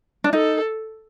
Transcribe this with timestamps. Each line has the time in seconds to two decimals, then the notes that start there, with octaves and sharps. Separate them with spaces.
0.24 D4
0.33 D#4 A4